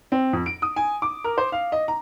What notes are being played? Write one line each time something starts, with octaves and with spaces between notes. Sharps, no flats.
C4
F2
D7
D#6
G#5
D6
A#4
C5
F5
D#5
A#5